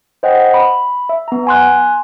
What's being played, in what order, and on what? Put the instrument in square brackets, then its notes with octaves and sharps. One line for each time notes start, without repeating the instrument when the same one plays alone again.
[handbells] C5 D#5 F#5 G5
B5
E5
B3 A#5
G#5 C6 F#6